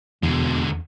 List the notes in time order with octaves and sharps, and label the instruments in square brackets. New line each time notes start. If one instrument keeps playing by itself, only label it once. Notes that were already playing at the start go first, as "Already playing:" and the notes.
[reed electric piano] E2 [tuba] B2 [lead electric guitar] D3 G#3